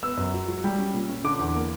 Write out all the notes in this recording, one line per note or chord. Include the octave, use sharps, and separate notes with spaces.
B3 E6
F#2
F#3
F#3
G3
C#4
A#2
C#4
D3 D6
E2
A#3